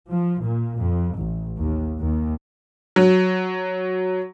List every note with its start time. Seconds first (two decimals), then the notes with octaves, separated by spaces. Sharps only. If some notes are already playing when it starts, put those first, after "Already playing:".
0.11 F3
0.40 A#2
0.78 F2
1.15 A1
1.59 D#2
2.00 D#2
2.96 F#3